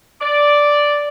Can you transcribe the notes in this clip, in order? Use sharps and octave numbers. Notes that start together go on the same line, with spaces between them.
D5